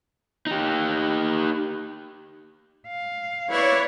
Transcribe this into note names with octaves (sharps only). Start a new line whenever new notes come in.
D#4 G4
F5
E4 B4 C#5 D5